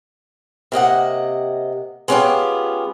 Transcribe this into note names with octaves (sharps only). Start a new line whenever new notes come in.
C3 A#3 D#5 F#5
G#3 B3 C#4 D#4 F4 G4